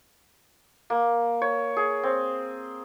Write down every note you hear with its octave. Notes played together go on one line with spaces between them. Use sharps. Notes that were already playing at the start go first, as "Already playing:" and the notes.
A#3
C#5
G#4
C4